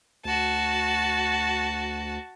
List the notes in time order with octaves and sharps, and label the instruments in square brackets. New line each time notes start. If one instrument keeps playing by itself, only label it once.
[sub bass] D2 [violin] F#4 A5